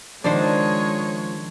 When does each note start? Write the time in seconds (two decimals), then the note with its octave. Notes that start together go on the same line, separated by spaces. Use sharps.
0.24 C#2 D#3 F3 G#3 D4 C5 C#5